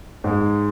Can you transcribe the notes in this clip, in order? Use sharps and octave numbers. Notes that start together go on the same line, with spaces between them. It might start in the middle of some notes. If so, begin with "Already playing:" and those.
G#2 G#3